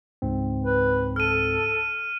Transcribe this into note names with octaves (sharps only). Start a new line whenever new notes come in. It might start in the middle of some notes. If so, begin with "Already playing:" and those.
C#2 G#2 C4
B4
A4 F6 D#7